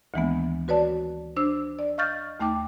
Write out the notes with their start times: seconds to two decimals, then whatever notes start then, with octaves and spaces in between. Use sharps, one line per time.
0.14 D2 D#3 E3 G#3 A#3 B3
0.68 F#4 B4 C#5 D5 A5
1.37 D4 C5 E6
1.79 D5
1.98 D#5 F5 C#6 F6 G6 A6
2.40 D#2 A3 D#4 G5 D6